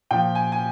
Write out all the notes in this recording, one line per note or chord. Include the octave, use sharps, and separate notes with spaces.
A#2 F3 G5
G#5
G#5